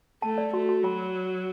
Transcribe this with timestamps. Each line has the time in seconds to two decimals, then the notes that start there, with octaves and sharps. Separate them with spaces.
0.22 A3 A5
0.38 D5
0.53 A3 F#4
0.69 F#4
0.84 F#3 B5